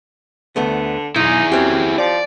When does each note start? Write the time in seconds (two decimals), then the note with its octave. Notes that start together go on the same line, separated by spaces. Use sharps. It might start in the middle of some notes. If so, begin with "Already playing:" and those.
0.56 D2 D3 A3 B3
1.16 B1 D#4 E4 G#4
1.52 F#2 C4 G4
1.99 F3 D5